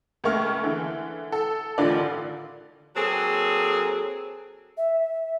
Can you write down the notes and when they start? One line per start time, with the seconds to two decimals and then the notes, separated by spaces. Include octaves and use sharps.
0.24 C#2 A3 A#3 C#6 F6
0.63 D3 E3
1.32 A4
1.78 A1 D3 D#3 F4 D5
2.96 F#3 A#3 C4 G#4 A4
4.77 E5